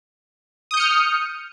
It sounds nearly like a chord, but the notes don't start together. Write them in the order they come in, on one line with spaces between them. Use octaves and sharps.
D#6 G6 C#7 F6